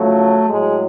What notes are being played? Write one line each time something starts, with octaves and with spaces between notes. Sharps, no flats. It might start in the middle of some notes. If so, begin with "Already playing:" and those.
Already playing: C#3 F3 F#3 A3
A2 F#3 G#3